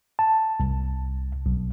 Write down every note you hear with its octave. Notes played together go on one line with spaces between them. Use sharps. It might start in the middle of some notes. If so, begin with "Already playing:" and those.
A5
C2
B1